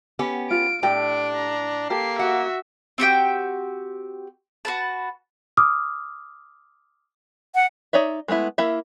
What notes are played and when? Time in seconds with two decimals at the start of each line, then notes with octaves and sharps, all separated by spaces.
0.19 B3 C#4 G4
0.51 F4 D7
0.83 A2 D4 G4 D5 G5 D7
1.36 A#5
1.90 A#3 G4 A4 C7
2.19 F#4 E5 F#5
2.98 C4 F#4 G4 G5
4.65 F#4 B4 A5
5.57 D6 D#6 F6
7.55 F#5
7.93 D#4 C#5 D5 E5
8.28 G#3 A3 B3 E4
8.58 A#3 E4 E5